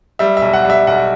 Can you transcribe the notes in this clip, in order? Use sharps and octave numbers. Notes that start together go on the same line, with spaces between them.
G3 E5
B1 E5
F#5
G3 E5
B1 F#5